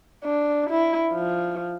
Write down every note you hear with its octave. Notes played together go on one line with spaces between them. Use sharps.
D4
E4
F3